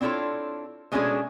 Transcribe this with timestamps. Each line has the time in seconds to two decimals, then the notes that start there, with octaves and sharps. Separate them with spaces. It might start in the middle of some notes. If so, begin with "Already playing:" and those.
0.01 C4 D4 E4 F4 A4 C#5
0.92 B2 G#3 A3 C#4 D4 G#4